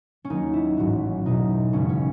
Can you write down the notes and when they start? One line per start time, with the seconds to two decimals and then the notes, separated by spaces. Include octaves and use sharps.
0.25 C#4
0.30 D#2 D#3 F#3 D#4
0.53 E4
0.77 A1 G#2 F#3 F#4
1.25 E1 E2 B2 D#4
1.73 G#1 F#2 C#3 E3 C#4
1.89 C#4